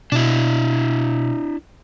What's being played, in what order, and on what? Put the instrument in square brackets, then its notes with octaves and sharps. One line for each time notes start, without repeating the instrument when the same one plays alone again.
[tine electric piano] B2 [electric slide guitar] D4 E4